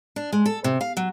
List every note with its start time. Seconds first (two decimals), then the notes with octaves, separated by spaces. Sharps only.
0.16 D4
0.32 G#3
0.46 A4
0.64 C3
0.81 F5
0.97 F#3